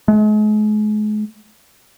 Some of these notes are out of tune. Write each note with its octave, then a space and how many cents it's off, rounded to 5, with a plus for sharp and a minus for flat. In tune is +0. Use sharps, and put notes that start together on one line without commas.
G#3 +40